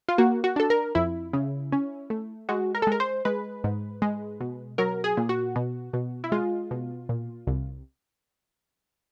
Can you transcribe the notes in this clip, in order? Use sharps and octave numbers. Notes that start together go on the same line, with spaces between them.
F4
A#3 F#4
F#4
D4 A4
A#4
F2 E4
C#3
C#4
A3
G#3 F#4
A#4
A4
G#3 A#4
C5
G#3 B4
G#2
G#3
B2
F#3 A#4
G#4
A#2
F#4
B2
B2
E4
G#3 F4
B2
A#2
C2